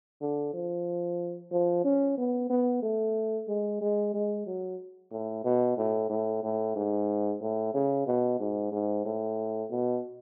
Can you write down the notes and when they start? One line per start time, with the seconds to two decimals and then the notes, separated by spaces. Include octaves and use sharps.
0.21 D3
0.54 F3
1.51 F3
1.84 C#4
2.18 B3
2.50 B3
2.82 A3
3.48 G#3
3.81 G#3
4.14 G#3
4.46 F#3
5.12 A2
5.44 B2
5.77 A2
6.09 A2
6.43 A2
6.76 G#2
7.41 A2
7.74 C#3
8.07 B2
8.39 G#2
8.72 G#2
9.05 A2
9.70 B2